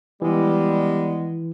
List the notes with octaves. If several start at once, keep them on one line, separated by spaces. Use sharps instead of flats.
E3 G3 G#3 B3